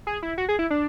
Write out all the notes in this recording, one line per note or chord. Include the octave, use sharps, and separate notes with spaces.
G#4
E4
F#4
G#4
E4
D4